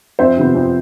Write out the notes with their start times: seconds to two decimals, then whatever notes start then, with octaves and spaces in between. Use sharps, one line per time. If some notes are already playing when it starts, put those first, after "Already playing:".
0.19 F2 C5 E5
0.37 C3 F3 B3
0.55 F2